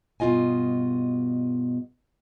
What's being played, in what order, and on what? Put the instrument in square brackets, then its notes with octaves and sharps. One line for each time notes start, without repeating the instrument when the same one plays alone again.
[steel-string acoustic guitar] G2 B2 E4 F4 D#5 G#5